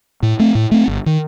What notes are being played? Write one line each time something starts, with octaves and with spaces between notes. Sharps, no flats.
A2
A3 C4
A2
A3 C4
G1
D#3